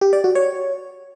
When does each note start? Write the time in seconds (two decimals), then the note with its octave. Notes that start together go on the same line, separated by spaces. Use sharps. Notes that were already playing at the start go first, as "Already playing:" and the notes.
0.01 G4
0.13 D5
0.24 F#4
0.35 C#5